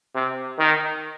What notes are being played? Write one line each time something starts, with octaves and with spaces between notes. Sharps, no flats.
C3
D#3